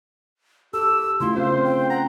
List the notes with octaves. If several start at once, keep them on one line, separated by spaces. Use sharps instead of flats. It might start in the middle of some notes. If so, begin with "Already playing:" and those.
G4 A4 E6
C#3 A3 E4 F4 C6
C4 C5 F5
G5
F#5 A#5